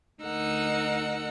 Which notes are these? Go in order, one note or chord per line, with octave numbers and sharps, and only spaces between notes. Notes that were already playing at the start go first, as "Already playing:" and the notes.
D2 D#4 A#4 F#5 E6